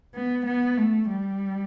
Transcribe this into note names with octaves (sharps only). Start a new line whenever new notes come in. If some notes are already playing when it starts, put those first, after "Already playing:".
B3
B3
A3
G3